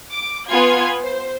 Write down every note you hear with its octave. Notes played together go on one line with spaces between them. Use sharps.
D6
B3 F4 G#5 G#6
C5